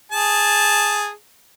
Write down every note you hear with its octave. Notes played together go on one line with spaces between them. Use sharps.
G#4 A5